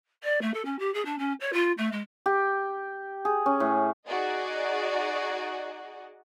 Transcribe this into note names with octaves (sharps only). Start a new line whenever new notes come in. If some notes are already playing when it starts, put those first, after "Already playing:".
D5
A3
A4
C#4
G4
G#4
D4
C#4
C#5
F4
A3
G#3
G4
G#4
C#4
A2
D#4 F#4 G#4 D5 D#5